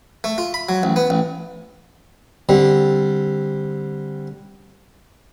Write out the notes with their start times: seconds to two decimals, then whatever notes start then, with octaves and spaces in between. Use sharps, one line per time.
0.24 A3
0.38 F4
0.54 B5
0.69 F#3
0.83 A1
0.96 B3
1.10 A1
2.49 D3 G3 C4